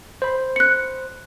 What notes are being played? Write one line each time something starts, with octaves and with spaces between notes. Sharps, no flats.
C5 B5
F#6 C#7